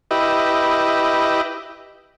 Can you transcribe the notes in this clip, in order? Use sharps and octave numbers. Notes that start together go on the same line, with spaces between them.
E4 G4 B4 D#5